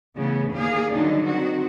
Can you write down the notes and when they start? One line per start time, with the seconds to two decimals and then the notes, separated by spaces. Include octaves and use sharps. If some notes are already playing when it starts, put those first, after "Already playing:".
0.16 C#3 E3 A3 B3
0.53 D#2 A#3 G#4 D5 F5
0.93 D3 D#3 F#3 G3 D4 D#4
1.26 D#3 C4 F#4